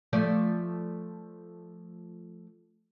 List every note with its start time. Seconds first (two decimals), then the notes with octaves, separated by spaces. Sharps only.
0.13 F3 A3 D5